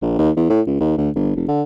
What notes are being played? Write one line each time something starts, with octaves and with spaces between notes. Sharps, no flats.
A#1
D#2
E2
A2
C#2
D#2
D2
G1
F1
D3